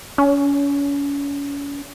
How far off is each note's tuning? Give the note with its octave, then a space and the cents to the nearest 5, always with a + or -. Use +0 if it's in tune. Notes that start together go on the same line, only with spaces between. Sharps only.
C#4 +35